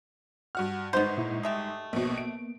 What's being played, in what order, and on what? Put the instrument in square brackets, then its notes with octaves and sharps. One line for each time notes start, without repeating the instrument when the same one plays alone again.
[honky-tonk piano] G2 F#4 F6 [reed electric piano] F#5
[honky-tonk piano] G1 G#2 D#4 [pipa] B3 C5
[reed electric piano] A#2 E4
[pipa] G#3 A3 G4 [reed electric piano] D#6 E6
[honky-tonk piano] A#1 B2 [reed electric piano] A#3 B3
[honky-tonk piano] D7